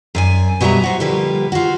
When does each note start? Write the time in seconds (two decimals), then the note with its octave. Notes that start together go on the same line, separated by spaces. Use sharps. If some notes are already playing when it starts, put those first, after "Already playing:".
0.15 F#2 D5 G#5
0.60 B2 F#3 G3 B3 E5 A#5
0.83 F#4 C5
1.00 D3 F3 G3 A#3 G4 B4
1.52 F4 F#4